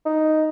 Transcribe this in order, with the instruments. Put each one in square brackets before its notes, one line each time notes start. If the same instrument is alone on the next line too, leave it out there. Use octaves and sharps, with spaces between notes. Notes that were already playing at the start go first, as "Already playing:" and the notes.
[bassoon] D#4